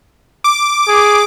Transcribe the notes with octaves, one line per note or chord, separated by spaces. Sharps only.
D6
G#4